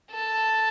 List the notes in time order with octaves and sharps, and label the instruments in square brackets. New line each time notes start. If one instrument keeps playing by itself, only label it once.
[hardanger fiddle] A4